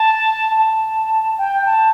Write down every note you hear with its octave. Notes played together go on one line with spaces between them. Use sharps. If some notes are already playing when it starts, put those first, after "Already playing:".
Already playing: A5
A5
G5
A5